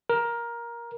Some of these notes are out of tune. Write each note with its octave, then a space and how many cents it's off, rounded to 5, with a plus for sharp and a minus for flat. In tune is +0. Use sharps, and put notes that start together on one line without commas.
A#4 +15